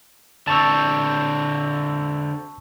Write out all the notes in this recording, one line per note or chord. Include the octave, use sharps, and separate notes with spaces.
D3 C4 A5 C#6 E6